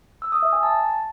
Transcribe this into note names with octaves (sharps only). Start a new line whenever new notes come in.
E6
D#6
E5
G#5
A5